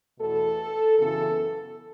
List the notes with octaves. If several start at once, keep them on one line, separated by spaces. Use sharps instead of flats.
E2 B2 A3 A4
F#2 C#3 E3 B3 A4